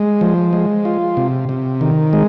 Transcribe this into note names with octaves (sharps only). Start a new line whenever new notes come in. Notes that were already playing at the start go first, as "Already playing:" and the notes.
Already playing: G#3
F3
G#3
F4
C3
C3
D#3
G#3